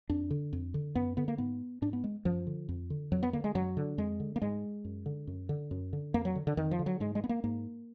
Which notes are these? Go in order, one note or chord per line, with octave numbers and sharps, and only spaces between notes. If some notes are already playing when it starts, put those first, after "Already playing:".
F2 D4
D3
F2
D3
F#2 B3
D3 B3
A#3
G#2 B3
G#2 D4
B3
G#3
F#2 F3
D3
F2
D3
F2 F#3
B3
D3 A#3
G#3
F#2 F#3
D3
F2 G#3
D3
A#3
G#2 G#3
F#2
D3
F#2
D3
F#2
D3
F2 A#3
F#3
D3
D3
F2 D#3
F3
D3
F#3
G#2 G#3
G#3
B3
A#3
G#2 A#3